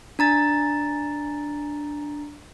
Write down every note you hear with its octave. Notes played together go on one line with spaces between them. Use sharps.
D4 A#5 A6